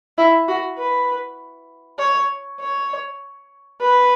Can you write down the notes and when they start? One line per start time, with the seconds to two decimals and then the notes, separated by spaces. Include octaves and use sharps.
0.18 E4
0.48 F#4
0.78 B4
1.99 C#5
2.60 C#5
3.81 B4